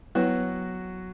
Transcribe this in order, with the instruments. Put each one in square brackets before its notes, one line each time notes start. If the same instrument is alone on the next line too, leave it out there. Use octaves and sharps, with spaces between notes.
[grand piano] F#3 F#4 [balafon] B3 E4 B4